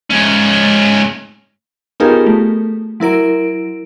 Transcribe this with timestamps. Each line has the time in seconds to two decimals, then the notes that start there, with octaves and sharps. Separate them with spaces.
0.10 G#2 C#4
2.00 B3 D#4 F4 G4 G#4 A#4
2.26 A3
3.00 F#3 E4 A#4 D7